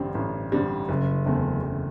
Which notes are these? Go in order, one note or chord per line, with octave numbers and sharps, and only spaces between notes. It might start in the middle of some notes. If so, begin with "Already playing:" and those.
Already playing: A1 G2 D3 G3 C4
A1
G2 D3 G3 C4
F#1
E2 D3 A3 C4
F#1